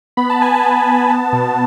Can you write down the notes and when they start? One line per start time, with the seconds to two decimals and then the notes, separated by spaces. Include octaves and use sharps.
0.17 B3 B5
0.30 A5
0.40 B3 G#5
0.54 A5
0.63 B3
0.87 B3
1.10 B3
1.33 B2